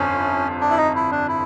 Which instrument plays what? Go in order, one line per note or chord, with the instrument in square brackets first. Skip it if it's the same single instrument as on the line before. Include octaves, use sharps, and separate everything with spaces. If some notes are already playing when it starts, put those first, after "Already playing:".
Already playing: [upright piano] G1 F2 C3 [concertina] C#4
[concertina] D4
E4
D#4
E4
D4
E4